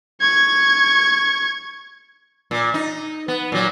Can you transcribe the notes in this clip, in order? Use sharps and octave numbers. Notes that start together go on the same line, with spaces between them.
C#6 G#6
A#2
D#4
B3
A#2 F#3